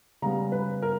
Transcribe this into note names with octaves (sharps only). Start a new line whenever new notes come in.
C#3 G3 B3 A#5
B4
A#4